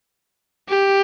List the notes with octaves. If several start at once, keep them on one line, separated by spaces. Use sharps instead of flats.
G4